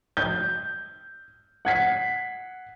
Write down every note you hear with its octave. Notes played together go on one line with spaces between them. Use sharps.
G6
F#5 G#6 B6 C7